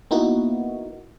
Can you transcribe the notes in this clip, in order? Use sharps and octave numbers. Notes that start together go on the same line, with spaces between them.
A#3 B3 D#4 E4 F#4